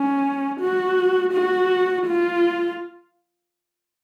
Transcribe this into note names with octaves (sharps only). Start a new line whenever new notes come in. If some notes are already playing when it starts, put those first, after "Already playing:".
Already playing: C#4
F#4
F#4
F4